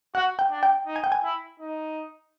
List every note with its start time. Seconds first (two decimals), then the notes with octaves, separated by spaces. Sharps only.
0.15 F#4 F#5
0.39 G5
0.51 D4
0.63 G5
0.87 D#4
0.96 G#5
1.04 G5
1.12 G#5
1.23 E4
1.60 D#4